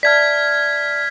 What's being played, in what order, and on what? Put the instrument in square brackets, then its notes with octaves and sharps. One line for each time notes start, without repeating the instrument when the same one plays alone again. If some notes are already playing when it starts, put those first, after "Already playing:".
[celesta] D5 E5 A5 [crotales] F6 G#6 B6